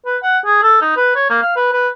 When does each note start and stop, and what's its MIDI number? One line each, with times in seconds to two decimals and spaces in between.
0.06 0.17 71
0.23 0.38 78
0.45 0.58 68
0.63 0.80 69
0.81 0.95 63
0.97 1.13 71
1.15 1.29 73
1.30 1.39 58
1.42 1.53 77
1.56 1.72 71
1.73 1.88 71